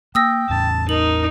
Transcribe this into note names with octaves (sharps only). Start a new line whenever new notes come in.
A#3 G5 D#6 E6 A#6
E2 A2 A5
D#4 A#4 F#7